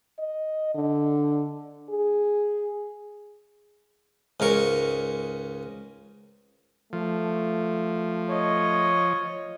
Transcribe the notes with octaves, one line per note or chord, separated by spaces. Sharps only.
D#5
D3
G#4
C#2 G#2 A#4 C#6
F3 A3
C#5 D#5